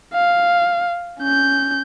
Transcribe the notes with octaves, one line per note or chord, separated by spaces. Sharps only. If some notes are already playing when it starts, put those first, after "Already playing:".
F5
C#4 G6